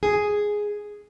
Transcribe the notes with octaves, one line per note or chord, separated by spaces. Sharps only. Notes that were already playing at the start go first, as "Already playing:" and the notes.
G#4